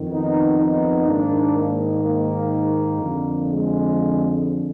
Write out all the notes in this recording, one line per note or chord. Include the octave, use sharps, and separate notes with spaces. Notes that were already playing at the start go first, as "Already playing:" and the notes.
Already playing: F2 D#3
B3 D#4
B3 D#4
G#2 D#3 A#3 D4
A#3
A#3
F2 D3
G#3